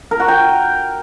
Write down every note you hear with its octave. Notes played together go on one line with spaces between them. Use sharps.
A#4
F#4
G5